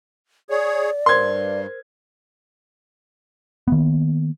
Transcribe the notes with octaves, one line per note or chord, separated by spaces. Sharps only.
G#4 C#5 D5
G2 A#4 C5 C6 G#6
D#3 A#3 B3